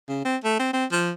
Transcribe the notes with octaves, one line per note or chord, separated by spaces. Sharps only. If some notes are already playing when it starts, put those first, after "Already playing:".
C#3
C4
A3
C4
C4
F3